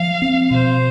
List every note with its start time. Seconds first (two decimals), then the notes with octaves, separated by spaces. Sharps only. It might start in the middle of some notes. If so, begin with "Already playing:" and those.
Already playing: F3 F5
0.22 C4
0.51 B2 C5